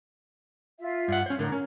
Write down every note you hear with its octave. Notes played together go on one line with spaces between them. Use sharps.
F4 E5
G2 F#5
C#4 C5
A2 D3 A#4
C#4